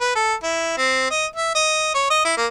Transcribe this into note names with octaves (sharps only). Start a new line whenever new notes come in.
B4
A4
E4
C4
D#5
E5
D#5
C#5
D#5
E4
A#3